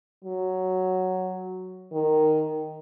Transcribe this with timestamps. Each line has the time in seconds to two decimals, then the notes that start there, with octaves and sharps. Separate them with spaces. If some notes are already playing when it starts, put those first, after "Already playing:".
0.24 F#3
1.93 D#3